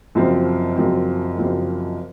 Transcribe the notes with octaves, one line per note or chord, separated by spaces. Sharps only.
F#1 F#2 F3 C4
F#1 F#2 F3 C4
F#1 F#2 F3 C4